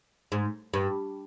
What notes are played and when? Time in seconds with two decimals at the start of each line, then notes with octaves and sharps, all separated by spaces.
0.32 G#2
0.74 G2